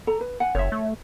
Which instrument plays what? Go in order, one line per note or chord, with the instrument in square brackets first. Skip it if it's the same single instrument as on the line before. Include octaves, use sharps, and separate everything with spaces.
[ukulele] A4 A#5
B4
F#5 G#5
[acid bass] F#1 [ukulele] C#5 E5
[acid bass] A3